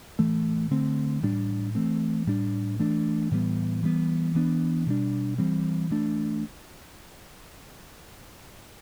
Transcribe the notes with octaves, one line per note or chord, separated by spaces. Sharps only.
A2 E3 A3
D3 A3 C4
A2 E3 G3 D4
E3 A3 C4
A2 G3 D4
E3 A3 D4
A2 E3 G3 B3
E3 G3 B3
E3 B3 D4
B2 G3 D4
E3 G3 C4
E3 A3 D4